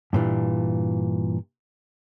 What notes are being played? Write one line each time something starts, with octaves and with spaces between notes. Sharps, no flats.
G2 A#2 E3 D4